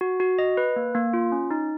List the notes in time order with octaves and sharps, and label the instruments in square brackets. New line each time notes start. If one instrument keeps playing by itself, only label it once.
[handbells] F#4
F#4
D#5
B4
A#3
A#3
F4
C#4
D#4